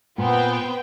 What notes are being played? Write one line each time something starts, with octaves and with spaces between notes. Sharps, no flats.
A#2 B3 C4 G5